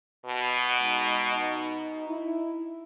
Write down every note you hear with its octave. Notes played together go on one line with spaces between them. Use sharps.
B2
G#3 D#4
D#4
E4